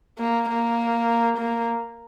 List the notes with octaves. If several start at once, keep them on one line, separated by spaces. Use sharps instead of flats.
A#3
A#3
A#3